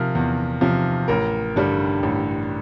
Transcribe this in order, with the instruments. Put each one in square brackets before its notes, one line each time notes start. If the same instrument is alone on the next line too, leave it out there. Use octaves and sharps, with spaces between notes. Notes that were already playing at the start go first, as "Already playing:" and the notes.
Already playing: [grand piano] C3 F3 A#4
E2
C3 F3
A1 A#4
G2 D3 G3
A1